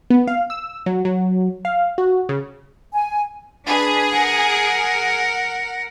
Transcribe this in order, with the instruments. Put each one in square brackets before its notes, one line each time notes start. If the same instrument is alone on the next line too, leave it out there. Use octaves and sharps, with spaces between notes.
[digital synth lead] B3
F5
E6
F#3
F#3
F5
F#4
C#3
[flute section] G#5
[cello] D4 B4 [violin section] G#4
[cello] A#4 F#5